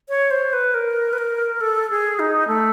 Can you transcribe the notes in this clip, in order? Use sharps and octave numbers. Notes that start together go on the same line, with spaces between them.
C#5
C5
B4
A#4
B4
A#4
A4
G#4
D#4
A3